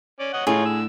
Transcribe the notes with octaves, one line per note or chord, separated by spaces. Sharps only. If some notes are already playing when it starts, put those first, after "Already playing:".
C#4 D5
C#5 D#5 F#5
A2 A3 D#4 F4 G#4 C#5
D3 E6